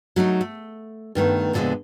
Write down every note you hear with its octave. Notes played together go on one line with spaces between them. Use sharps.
F#3 A3 D4 D#4
A3
G2 D#3 A3 B3
F2 A#2 D3 G3 G#3 B3